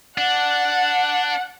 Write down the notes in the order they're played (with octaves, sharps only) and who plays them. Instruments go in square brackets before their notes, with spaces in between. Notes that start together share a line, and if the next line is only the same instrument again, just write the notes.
[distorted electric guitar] D4 [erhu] F#5